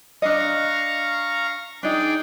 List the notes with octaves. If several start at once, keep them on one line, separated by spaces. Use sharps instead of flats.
D4 D#5 F5 A#5 C#6
D4 D#4 G#4 D5 G5